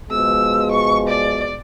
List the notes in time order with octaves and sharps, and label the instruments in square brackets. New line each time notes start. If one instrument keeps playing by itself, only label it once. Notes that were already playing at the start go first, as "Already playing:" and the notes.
[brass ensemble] B2 F3 G#3 [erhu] E6
[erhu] C#6
D5